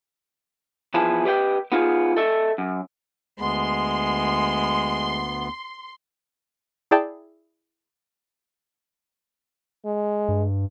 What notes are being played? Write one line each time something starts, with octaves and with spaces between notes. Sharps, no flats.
E2 F3 E4 G#4 B4 A5
G4 B4 D#5 E5 G5
B3 D#4 F4 G#4
A4 D#5 E5
F#2
D2 G#3 B3 C6
E4 G#4 D5 G5 A5
G#3
G2